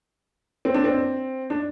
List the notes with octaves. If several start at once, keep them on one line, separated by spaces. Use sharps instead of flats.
C4
D4
C4
D4